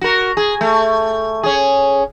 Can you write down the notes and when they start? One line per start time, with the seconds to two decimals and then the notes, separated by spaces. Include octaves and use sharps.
0.01 F#4 A#4
0.37 G#4
0.61 A3
1.43 C#4 G#4